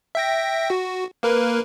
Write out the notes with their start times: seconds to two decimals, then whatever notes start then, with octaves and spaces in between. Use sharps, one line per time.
0.15 E5 G5 A#6
0.70 F#4
1.23 A#3 A#4 B4